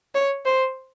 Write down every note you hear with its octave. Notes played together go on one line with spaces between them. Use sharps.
C#5
C5